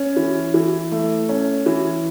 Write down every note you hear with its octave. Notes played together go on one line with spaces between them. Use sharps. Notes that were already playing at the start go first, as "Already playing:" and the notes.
Already playing: C#4
E3
E3
A3
C#4
E3